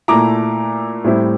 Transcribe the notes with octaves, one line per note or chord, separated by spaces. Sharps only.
A#2 A3 E4 A#5 D6
A2 G3 C4 E4